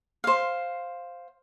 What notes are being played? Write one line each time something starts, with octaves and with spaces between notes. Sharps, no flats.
C5 F5